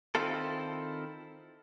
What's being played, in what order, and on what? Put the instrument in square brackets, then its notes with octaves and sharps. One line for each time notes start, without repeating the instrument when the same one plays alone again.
[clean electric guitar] D#3 C4 E4 F4 A4